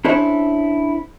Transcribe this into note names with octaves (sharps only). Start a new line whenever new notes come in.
C#4 D4 E4 A4 C5 C#5